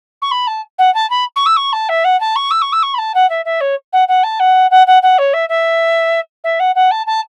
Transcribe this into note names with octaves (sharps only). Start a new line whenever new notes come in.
C#6
B5
A5
F#5
A5
B5
C#6
E6
C#6
A5
E5
F#5
A5
C#6
E6
C#6
E6
C#6
B5
A5
F#5
E5
E5
C#5
F#5
F#5
A5
F#5
F#5
F#5
F#5
C#5
E5
E5
E5
F#5
F#5
A5
A5